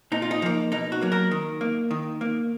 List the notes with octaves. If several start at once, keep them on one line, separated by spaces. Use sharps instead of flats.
A#2 D#4
F4
D#4
F3 A#3
B2 D#4
F#4
F#3 A#3
A#4
D#3
A#3
D#3
A#3